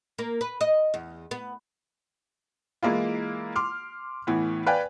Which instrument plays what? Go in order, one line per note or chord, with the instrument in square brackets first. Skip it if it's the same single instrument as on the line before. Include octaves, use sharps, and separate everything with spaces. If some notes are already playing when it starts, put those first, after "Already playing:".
[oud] A#3
B4
D#5
E2
B3
[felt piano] E3 G#3 A#3 E4 F4
C6 D6 F6
A2 E3 B3
B4 D5 F5 G5 G#5